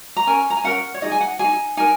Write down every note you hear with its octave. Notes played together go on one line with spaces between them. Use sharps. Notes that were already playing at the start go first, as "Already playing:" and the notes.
A#5
C#4 A#4 G#5
A#5
G#5
C#4 A#4 F#5
C#5
D#4 G#4 D#5
G#5
F#5
D#4 G#4 G#5
D#4 A#4 G#5